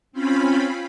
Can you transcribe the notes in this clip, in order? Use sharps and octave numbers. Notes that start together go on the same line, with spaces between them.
C4 C#4 F4 B5